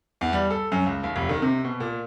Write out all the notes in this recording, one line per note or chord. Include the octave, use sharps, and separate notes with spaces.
E2
G3
A4
F#2
C#2
D#2
F1
D#3
C3
B2
A#2